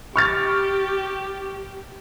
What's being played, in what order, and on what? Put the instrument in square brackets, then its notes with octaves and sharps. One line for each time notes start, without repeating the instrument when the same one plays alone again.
[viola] G4 [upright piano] C#6 F6 A6